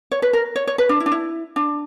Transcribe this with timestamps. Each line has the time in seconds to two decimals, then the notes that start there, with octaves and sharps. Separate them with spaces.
0.12 C#5
0.22 B4
0.33 A#4
0.56 C#5
0.67 C#5
0.78 B4
0.89 D4
1.00 E4
1.06 D4
1.12 E4
1.56 D4